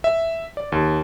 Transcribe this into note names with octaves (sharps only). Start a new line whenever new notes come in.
E5
D5
D#2